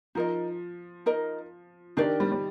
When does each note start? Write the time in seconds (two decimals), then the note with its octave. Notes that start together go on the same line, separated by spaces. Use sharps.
0.15 F3 D#4 A#4 D#5
1.06 D#4 A#4 D#5
1.97 D#3 D4 G4 A#4 D5
2.20 G3
2.32 G3